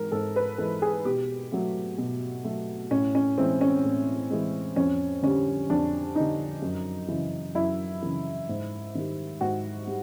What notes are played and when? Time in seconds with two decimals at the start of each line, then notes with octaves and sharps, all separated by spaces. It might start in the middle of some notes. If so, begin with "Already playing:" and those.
Already playing: G#2 E3 G#3 A#4
0.12 G#2 A4
0.36 B4
0.58 E3 G#3 A4
0.82 G#4
1.05 B2 G4
1.52 F#3 A3
1.98 B2
2.44 F#3 A3
2.91 A2 C#4
3.15 C#4
3.38 E3 G#3 C4
3.61 C#4
3.84 A2
4.30 E3 G#3
4.76 F2 C#4
5.23 D3 G3 C#4
5.70 F2 D4
6.16 D3 G3 D#4
6.62 F#2
7.08 C#3 E3
7.55 F#2 E4
8.03 C#3 E3
8.49 G#2
8.95 D#3 G3
9.41 G#2 F#4
9.87 G3